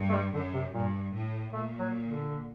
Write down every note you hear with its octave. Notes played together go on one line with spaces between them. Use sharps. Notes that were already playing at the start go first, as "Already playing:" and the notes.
Already playing: G2
A3
G3
F#2 D3
C3
G2 A#2
A2
A#2 A3
F#3
D3